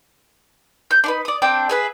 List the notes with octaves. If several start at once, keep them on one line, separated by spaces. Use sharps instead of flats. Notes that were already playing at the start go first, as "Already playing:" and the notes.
G6
D4 D#4 B4
D5 D#6
C4 D4 G5
G#4 B4 E5